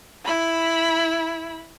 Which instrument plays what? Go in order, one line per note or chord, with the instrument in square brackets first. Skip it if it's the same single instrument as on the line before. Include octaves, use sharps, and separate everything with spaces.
[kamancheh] E4 B5